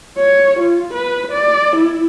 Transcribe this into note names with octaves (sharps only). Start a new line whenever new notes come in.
C#5
F4
B4
D5
E4